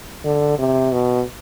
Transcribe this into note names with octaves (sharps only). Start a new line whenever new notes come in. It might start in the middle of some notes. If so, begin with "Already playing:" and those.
D3
C3
B2